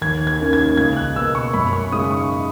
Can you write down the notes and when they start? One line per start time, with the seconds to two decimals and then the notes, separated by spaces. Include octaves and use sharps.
0.01 D#2 G#6
0.27 G#6
0.39 D#3 A#3 C#4
0.53 G#6
0.77 C#2 G#6
0.96 F#6
1.16 B2 A#3 E6
1.35 C#6
1.54 F#2 B5
1.73 C#6
1.92 C#3 G#3 D#4 D#6
2.11 C#6